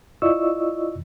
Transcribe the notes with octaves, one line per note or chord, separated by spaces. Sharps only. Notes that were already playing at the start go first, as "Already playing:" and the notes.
E4 F4 D5 D#5 C#6 E6